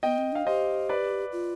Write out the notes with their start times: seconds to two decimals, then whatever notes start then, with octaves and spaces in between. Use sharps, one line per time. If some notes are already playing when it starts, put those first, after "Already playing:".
0.03 B3 D#5 G5
0.18 C4
0.32 D4 F5
0.47 G4 C5 D#5
0.89 B4 D5
1.32 F4